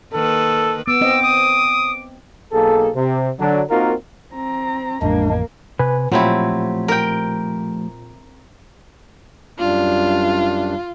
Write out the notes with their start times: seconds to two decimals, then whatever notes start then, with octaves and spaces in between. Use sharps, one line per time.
0.13 D#3 A#3 A4 B4
0.87 B3 D6 E6
1.01 C4 D#5
1.23 D#6
2.52 B1 A#3 G#4 A4
2.95 C3
3.39 D3 F#3 D4
3.70 A#3 C4 D#4 F4 F#4 A#4
4.33 C4 A#5
5.02 A1 F2 G#3 A#3 D4
5.79 C3 B4 G#5
6.12 A#2 F3 F#3 A3 C4 E4 F4 G4
6.88 A#4 G5
9.59 F#2 G3 D4 F4